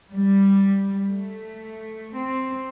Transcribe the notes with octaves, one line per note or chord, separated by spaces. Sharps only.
G3
A3
C4